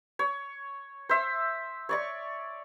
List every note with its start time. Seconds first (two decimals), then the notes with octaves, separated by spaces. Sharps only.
0.19 C#5
1.09 C5 E5
1.89 C#5 D5 C#6